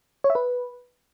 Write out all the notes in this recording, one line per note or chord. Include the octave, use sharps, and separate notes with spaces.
C#5
E5
B4